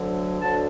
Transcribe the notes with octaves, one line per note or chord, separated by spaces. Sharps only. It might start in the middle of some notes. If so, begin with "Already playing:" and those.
Already playing: D2 D3 F#3
D2 D3 F#3 A5